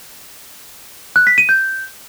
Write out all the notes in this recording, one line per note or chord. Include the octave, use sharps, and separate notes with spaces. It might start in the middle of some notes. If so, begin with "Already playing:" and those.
F#6
B6
D#7
G6